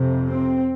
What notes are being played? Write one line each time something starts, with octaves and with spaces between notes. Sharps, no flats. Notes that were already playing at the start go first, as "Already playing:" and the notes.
Already playing: F2 C3
C4